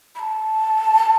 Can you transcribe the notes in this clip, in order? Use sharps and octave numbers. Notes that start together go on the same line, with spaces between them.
B5
A5